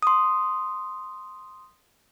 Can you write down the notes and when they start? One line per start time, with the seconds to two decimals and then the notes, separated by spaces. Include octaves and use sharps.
0.03 C6 D#6